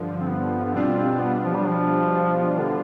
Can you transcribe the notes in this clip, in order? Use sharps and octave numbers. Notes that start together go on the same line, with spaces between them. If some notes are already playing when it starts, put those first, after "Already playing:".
Already playing: G2 D3 F3
C4
B3
B3
B2 G3 C4 D4 F4
C4
B3
F3
G3
F3
D3